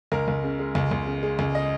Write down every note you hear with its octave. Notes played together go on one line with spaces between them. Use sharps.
C#2 A#4
C#2
C#3
G#3
C#2
C#2
C#3
G#3
C#2
D#5